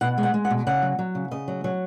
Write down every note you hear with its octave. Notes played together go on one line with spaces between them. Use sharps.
B2 F#5
G#3
F#5
G#3
F#5
B2
C#3 F#5
F#3
F#3
C#3
C#3 D#5
F#3
F#3